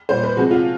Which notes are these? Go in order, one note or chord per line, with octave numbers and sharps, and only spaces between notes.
A#2 G3 C5
B4
C3 F3 G#3 F#4
F4